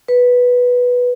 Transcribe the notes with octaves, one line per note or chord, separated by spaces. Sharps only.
B4